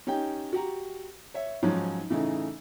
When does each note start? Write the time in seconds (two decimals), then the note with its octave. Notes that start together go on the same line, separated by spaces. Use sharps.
0.07 C#4 D#4 G4 G5
0.53 F#4 G4 A#5
1.34 C#5 E5
1.63 G#2 F3 F#3 C#4
2.10 A2 C#3 E3 A3 D#4